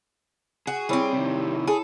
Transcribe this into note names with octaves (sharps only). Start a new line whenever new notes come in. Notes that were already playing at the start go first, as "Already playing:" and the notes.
F#4 G#4
G3 C4 E4 C#5
C3 D#3
G#4 A4